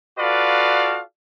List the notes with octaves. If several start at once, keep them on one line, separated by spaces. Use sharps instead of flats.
F4 F#4 A4 B4 D5 F5